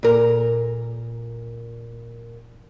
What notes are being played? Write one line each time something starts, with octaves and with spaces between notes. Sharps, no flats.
A#2 A#4